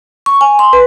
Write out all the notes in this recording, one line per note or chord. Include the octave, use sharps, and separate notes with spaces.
C#6
G#5
C6
B4